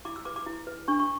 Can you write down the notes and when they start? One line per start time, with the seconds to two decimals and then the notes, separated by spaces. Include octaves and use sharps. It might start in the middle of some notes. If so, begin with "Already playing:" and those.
0.05 E4 D6
0.16 E6
0.25 B4 D6
0.36 D6
0.46 E4
0.67 B4
0.88 D4 C#6
0.99 C#6